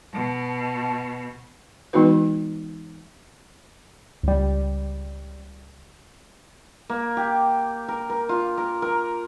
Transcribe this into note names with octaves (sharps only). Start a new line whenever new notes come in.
B2 A5
E3 G#3 B3 D#4 F#4 B4
C#2 G3
A#3
G4
A#4
A#4
F4
A#4
A#4